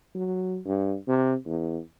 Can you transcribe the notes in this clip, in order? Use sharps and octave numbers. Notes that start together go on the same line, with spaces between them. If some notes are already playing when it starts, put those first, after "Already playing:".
F#3
G2
C3
E2